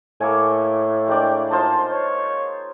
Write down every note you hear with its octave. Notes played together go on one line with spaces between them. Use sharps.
A2 A#3 A4 G#5
G#3 A#3 D4 G5
D#4 F4 C5 A5
C#5